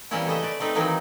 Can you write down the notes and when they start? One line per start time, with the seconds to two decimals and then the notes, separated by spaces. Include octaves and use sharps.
0.11 E3 G3 A#3 C4 C#4 E4
0.26 C#3 A3 D#5 E5
0.42 B4 D5
0.60 A3 C4 D#4 B4
0.75 D#3 E3 F#3 A#3 C4 D#4